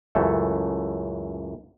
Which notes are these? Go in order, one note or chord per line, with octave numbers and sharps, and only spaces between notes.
C#2 F#2 E3 A3 A4